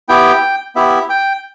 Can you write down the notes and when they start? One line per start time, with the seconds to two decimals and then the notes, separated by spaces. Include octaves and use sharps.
0.09 B3 E4 G4 G5
0.76 B3 E4 G4 E5
1.10 G5